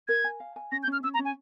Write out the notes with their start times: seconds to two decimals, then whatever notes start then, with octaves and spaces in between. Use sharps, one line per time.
0.08 A#4 G#6
0.24 G#5
0.40 F5
0.56 G#5
0.72 C#4 A#6
0.83 G6
0.87 C#4
0.92 F6
1.03 C#4 E6
1.14 A#5
1.19 C#4
1.25 G#5